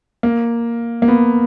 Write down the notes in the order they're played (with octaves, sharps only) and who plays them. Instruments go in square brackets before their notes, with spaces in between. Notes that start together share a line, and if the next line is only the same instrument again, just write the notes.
[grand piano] A#3
A#3
B3